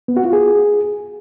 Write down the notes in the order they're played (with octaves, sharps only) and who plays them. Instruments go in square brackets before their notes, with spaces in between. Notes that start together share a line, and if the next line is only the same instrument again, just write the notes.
[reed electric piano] B3
F#4
F4
G#4